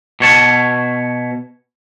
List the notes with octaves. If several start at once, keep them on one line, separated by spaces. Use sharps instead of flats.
B2 C#5 A5